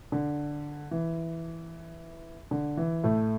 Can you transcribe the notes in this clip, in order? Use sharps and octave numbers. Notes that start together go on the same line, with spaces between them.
D3
E3
D3
E3
A2 A3